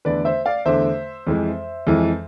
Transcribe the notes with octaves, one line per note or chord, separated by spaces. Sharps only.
E2 D3 A3 B4 D5
C5 E5
D5 F5
E2 D3 A3 C5 E5
F2 E3 G#3
F2 E3 G#3